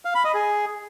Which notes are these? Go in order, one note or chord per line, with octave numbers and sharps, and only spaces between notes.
F5
B5
D#5
G#4